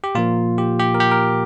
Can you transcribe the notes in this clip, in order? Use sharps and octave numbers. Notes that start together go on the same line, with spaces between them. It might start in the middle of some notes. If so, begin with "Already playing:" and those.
G4
A#2 F3 A#3 F4
G4
G4
A#4
G4
A#4